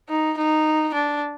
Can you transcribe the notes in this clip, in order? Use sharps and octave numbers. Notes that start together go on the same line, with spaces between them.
D#4
D#4
D4